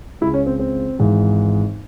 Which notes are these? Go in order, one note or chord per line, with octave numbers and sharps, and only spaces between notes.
C#2 C#3 G#3 E4
C#4
C4
C4
G#1 G#2 E3 G#3